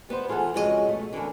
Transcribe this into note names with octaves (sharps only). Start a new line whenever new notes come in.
G3 B3 B4 C5
E3 F4 G#4 A4 F#5
F2 C#3 F#3 G#3 A4 D#5
B2 A3
D3 E3 C#4 A4 A#4